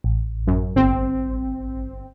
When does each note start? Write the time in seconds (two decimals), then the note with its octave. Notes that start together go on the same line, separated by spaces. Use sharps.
0.04 A1
0.47 F#2
0.76 G1 C4